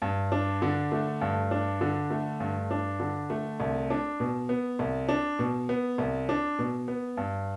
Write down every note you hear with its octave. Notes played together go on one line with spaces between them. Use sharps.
G2
D4
D3
A3
G2
D4
D3
A3
G2
D4
D3
A3
C2
D4
B2
B3
C2
D4
B2
B3
C2
D4
B2
B3
G2